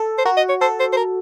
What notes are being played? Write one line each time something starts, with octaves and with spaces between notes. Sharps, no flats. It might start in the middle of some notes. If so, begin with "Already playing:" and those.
Already playing: A4
C5
F#4 A#4
D#5
C#5
A4 C5
C5
C5
A#4